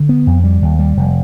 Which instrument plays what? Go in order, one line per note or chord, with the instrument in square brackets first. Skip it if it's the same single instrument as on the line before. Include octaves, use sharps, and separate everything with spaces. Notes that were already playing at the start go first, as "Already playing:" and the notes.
Already playing: [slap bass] D3
B3
F2
G3
D#2
G3
F1